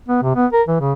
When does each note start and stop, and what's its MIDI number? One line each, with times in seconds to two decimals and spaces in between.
0.09 0.21 59
0.23 0.34 48
0.36 0.46 59
0.53 0.62 70
0.68 0.77 52
0.80 0.93 49